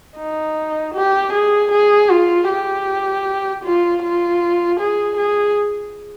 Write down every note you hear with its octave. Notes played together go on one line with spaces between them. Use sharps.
D#4
G4
G#4
G#4
F4
G4
F4
F4
G#4
G#4